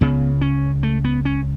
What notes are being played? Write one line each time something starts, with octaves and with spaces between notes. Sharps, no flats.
C#2 C#3 B3
C#4
A3
B3
C#4